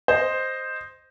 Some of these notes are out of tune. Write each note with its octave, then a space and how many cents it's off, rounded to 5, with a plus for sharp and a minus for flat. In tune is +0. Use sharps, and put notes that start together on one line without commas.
C5 +0 D#5 +0